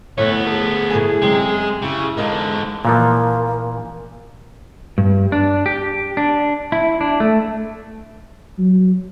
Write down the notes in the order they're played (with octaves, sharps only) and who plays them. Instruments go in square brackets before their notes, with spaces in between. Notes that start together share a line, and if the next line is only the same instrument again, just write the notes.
[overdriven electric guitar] D2 B3 [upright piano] A2 A3 E5 [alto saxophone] C#5
[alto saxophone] G#4 [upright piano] A4
[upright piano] A2 A3 G#5
[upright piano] F#2 C3 G5 [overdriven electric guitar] G#3
[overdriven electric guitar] C#3 [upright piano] E4 G4
[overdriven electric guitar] G#2 D3 [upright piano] A#4 D#5 F5
[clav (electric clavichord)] A#2 E3 F3 [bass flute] A#3
[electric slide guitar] G2
D4
G4
D4
E4
D4
A3
[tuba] F#3